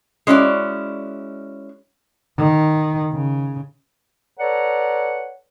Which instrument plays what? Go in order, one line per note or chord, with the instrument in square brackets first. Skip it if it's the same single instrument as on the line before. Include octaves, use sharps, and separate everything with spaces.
[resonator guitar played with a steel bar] G#3 C#4 E4 F#4 D5
[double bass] D#3
C#3
[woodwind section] A4 B4 C#5 D5 F#5 A#5